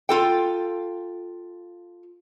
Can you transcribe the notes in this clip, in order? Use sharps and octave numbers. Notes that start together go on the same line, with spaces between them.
F4 A4 G5